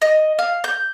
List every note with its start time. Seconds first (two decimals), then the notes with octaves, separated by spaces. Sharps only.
0.02 D#5
0.39 F5
0.64 G6